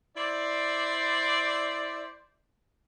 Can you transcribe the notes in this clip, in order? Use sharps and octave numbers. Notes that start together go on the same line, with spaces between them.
E4 C5 D5